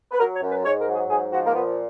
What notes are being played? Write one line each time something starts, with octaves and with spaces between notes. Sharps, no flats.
B4
F#3 A#4
C#5
F#2
B4
G#2 C#5
A#4
F#3
G#4
G#2 G#4
F3 F#4
A#3
A#2 B3